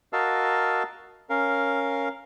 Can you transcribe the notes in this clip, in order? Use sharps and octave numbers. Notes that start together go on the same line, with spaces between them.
F#4 A#4 D#5 F5 A5 E6
C#4 A#4 F5